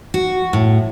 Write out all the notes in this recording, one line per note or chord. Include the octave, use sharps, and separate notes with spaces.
F#4
A2